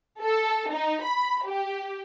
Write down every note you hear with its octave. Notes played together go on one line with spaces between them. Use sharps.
A4
D#4
B5
G4